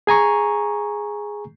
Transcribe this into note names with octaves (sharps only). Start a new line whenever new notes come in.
G#4 G#5 A#5 C#6